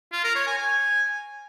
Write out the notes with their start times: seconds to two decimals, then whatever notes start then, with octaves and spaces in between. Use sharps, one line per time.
0.13 F4
0.24 A#4
0.35 C#5
0.47 G#5
0.58 G#5